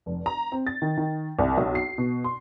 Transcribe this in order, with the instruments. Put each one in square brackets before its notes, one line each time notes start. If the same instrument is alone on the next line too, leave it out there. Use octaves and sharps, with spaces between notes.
[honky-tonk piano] F1
A#5
C4
A6
D#3
D#3
C2
B1
C7
B2
C6